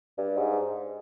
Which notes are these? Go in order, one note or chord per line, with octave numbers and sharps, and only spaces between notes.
G2
G#2